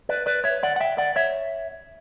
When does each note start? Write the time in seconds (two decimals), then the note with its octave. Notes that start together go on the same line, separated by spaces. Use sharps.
0.09 B4 D5
0.26 B4 D5
0.44 C#5 E5
0.63 D5 F#5
0.76 F#5
0.81 E5 G5
0.98 D5 F#5
1.16 C#5 E5